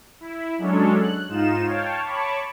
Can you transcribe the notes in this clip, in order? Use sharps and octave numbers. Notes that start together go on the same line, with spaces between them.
E4
F#3 G#3 C#4 D4 A4 C#5
F#6
G#2 D#4 F4 E7
C#5 F5 G5 A5
C#5 A5 B5 C#6 D6